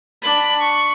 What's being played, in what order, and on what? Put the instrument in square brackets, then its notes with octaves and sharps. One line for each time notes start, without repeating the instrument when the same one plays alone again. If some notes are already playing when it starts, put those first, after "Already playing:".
[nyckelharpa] D4 B5
C#6